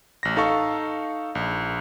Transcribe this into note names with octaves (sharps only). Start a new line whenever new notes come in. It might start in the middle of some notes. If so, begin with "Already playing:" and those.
A1 A#6
D#4 A4 F5 C#6
A#1